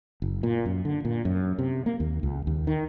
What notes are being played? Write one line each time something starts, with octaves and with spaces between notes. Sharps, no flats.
F#1
A#2
F#2
D3
A#2
F#2
C3
A#3
D#2
C#2
D#2
D#3